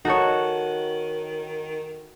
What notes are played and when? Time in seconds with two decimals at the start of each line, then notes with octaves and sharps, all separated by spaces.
0.05 D#3 D#4 F#4 A4 C#5